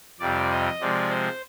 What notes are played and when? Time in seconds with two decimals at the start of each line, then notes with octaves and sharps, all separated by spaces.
0.20 F2 C3 G3 D5
0.51 D#5
0.80 C3 F3 G#3 D5
1.10 C5